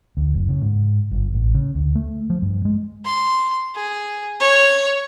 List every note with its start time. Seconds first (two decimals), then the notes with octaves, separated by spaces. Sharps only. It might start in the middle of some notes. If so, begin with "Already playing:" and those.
0.17 D2
0.34 F#1
0.49 C#3
0.62 G#2
1.11 G1
1.33 A1
1.54 C#3
1.75 D2
1.95 A3
2.30 F3
2.42 G2
2.65 G#3
3.05 C6
3.75 G#4
4.40 C#5